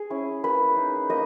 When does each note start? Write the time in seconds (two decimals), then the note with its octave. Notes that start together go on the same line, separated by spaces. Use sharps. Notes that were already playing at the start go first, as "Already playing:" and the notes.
Already playing: G#4
0.10 C#4 E4
0.44 A#3 B4
0.76 D#4
1.10 A#3 D#5